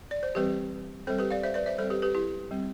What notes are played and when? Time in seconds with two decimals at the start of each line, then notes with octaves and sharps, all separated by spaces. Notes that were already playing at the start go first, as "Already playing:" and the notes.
0.11 D5
0.23 C5
0.35 E3 G3 C4 G4 B4
1.07 G3 C4 A4 C5
1.19 G4 B4
1.30 D5 F5
1.43 C5 E5
1.54 B4 D5
1.66 C5 E5
1.78 G3 C4 A4 C5
1.90 G4 B4
2.02 G4 B4
2.15 E4 G4
2.51 G3 C4